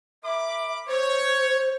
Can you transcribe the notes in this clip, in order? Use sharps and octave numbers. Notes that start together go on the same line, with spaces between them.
A#4 E5 B5 D6
C5 C#5